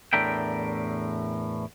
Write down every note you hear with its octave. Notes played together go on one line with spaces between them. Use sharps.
E2 A2 D4 A#4 E5 G5